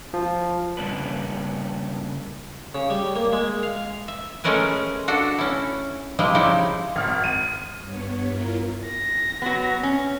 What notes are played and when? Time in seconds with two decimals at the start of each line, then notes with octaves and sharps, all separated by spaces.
0.14 F3
0.77 C#3 G3 A#3 C#4 D4 B4
2.75 C#3
2.90 G3
3.16 A#3
3.33 G#3
3.63 F5
4.08 E5
4.44 G#3 A3 C#4 A#4 B4 G#5
5.08 D4 F#4 A4
5.38 C#4 E4
6.19 F3 G3 G#3 E4
6.35 C#3 F3 D#4 E4 G4
6.96 G#1 F6
7.24 D#7
7.82 G2 B3 C#5
8.29 E4 F4 A#4
8.86 A#6
9.42 F#3 B3
9.83 C#4